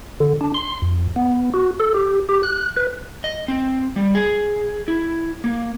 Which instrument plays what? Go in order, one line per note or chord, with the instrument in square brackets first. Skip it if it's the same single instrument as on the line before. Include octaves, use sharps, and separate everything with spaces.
[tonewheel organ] D3
D4
C6
F2
B3
F#4
A4
G4
G4
F#6
B4
[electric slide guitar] D#5
C4
G3
G#4
E4
A#3